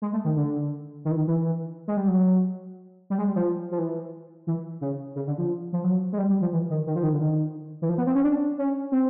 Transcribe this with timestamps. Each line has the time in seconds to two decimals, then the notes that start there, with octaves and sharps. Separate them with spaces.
0.02 G#3
0.13 A3
0.25 D#3
0.36 D3
1.05 D#3
1.11 E3
1.16 D#3
1.27 E3
1.88 G#3
1.97 G3
2.08 F#3
3.10 G3
3.18 G#3
3.27 G3
3.36 F3
3.71 F3
3.78 E3
4.47 E3
4.81 C#3
5.16 C#3
5.27 D3
5.38 F3
5.73 F3
5.84 F#3
6.13 G#3
6.18 G3
6.30 G3
6.41 F3
6.52 E3
6.70 D#3
6.87 D#3
6.96 F3
7.03 D#3
7.12 D3
7.20 D#3
7.82 E3
7.89 F3
7.98 B3
8.07 C4
8.15 C#4
8.24 D4
8.58 C#4
8.92 C4